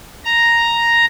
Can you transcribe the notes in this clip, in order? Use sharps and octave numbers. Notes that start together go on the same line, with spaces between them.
A#5